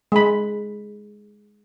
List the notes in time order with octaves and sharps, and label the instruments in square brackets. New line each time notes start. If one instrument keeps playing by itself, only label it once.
[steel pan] G#3 B5